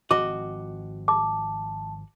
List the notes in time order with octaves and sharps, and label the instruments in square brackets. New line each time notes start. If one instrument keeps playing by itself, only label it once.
[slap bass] G#1 F3 C4 [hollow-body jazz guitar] F#4 D#5 [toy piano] D6
[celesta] A5 [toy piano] D6